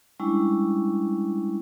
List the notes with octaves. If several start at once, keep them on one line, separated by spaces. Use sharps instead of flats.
G3 G#3 C#4 D4 E4